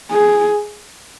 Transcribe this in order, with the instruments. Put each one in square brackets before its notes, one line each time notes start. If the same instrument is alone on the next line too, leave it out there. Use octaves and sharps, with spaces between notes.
[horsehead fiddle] G#4